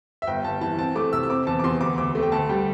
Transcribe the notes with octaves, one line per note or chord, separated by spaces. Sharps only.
E5
G1 G5
G1 A5
E3 A5
C4 A5
A3 D6
C3 E6
E6
C4 D6
E2 A5
D6
E2 C6
D2 D6
D2 D6
A3
G5
D2 A5
G3 G5